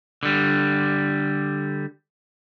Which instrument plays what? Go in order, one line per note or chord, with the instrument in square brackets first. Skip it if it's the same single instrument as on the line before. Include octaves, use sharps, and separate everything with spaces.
[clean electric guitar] D3 G3